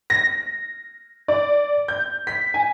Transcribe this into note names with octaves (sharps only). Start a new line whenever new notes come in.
A#6
D5
G6
B6
G#5